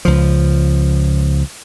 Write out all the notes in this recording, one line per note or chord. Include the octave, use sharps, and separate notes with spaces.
C#2 F3